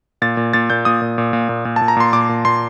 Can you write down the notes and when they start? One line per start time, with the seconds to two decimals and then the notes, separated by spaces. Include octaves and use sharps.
0.22 A#2 A6
0.37 A#2
0.53 A#2 A6
0.70 A#2 G6
0.85 A#2 D#6
1.02 A#2
1.18 A#2
1.33 A#2
1.49 A#2
1.65 A#2
1.76 A5
1.81 A#2
1.88 A#5
1.97 A#2 C6
2.13 A#2 D6
2.29 A#2
2.45 A#2 C6